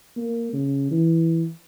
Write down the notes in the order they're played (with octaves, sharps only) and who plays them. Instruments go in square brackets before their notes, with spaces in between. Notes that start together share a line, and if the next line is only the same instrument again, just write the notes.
[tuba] A#3
C#3
E3